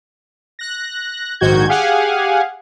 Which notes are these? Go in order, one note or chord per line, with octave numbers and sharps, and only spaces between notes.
F#6 A#6
A#1 G#2 D#3 F#4 G6 G#6
G4 G#4 F5 F#5 G#5